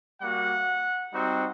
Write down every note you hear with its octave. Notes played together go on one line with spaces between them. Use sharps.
G3 A#3 F#4 F#5
G3 C4 D#4 F#4